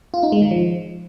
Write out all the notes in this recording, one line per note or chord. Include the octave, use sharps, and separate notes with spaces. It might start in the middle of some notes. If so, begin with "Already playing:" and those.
F4
D#4
G#3
D#3
F3